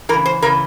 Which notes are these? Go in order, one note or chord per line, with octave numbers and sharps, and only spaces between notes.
C#3 E3 A#4
C5
C#3 E3 A#4